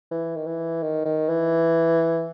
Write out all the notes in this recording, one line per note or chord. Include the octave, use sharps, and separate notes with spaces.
E3
D#3
E3
D#3
D#3
E3